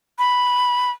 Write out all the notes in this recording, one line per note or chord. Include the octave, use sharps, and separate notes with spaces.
B5